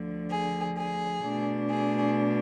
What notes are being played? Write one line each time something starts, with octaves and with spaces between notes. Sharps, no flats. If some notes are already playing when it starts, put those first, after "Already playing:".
Already playing: D2 D3 F3
G#4
G#4
B2 A3 D4
G#4